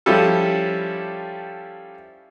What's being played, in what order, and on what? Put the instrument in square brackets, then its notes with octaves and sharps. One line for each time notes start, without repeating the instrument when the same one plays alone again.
[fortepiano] F3 G3 C#4 E4 G4 A4